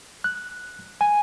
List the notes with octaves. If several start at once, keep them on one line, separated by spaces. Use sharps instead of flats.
F#6
G#5